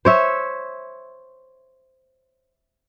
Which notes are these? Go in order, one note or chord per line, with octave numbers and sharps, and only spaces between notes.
C5 C#5 E5